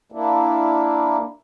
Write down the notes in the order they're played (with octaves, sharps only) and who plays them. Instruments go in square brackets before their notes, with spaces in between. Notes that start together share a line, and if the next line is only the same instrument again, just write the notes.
[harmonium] A#3 D4 E4